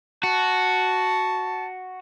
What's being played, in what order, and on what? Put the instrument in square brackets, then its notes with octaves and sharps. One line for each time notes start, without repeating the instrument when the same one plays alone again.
[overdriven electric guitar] F#4 [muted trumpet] A5